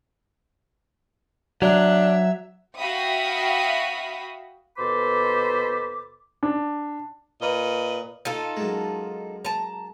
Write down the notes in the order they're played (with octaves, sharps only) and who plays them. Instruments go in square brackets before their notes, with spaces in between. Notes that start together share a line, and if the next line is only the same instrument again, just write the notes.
[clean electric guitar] F#3 [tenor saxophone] D4 [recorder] E5
[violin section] F#4 E5 F5 G5 B5 D#6
[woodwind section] D#2 B2 A4 C5 B5 D6
[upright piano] D4
[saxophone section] A#2 B4 D#5
[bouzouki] D#4 F4 A4
[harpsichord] F#2 G#3
[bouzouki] A5 A#5